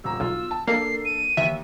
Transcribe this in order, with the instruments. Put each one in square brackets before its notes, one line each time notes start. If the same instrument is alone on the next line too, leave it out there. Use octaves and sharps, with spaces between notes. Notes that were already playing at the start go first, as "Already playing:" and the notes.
[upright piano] D#1 A#5 [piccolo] E6
[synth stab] B1 [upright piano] F4
[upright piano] A5
[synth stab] A#3 [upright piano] D4 A4 [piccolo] C7
[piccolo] D#7
[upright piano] D#2 [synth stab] E5